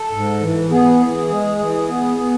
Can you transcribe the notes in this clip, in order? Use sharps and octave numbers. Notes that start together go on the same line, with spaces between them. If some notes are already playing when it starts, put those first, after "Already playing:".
Already playing: A4
G#2
E3
B3 G#4
E3
G#3
E3
B3
B3